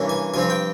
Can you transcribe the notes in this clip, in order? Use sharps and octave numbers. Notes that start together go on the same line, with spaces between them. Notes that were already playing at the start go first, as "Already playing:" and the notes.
Already playing: G2 E3 A#3 C#4
G#5
G2 F3 C4 G#5
G5